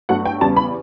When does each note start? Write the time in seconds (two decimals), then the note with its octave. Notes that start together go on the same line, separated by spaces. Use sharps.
0.09 G2 F#3 A3 F#5
0.25 G5
0.41 E2 C#3 G3 A5
0.56 B5